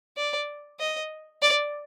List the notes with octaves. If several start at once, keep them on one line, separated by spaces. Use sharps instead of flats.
D5
D#5
D5